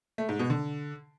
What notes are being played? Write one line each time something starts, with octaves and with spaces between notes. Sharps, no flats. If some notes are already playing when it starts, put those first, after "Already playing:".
A3
G#2
B2
D3